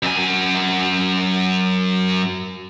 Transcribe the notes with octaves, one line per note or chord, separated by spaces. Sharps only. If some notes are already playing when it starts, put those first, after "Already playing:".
F#2 G#5